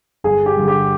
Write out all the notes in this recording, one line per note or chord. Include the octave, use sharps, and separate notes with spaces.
G1 G#4
G4
G2 D3
G4